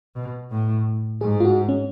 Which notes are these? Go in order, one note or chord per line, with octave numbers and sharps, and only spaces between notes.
B2
A2
G#2 G#4
F4
F#4
C#4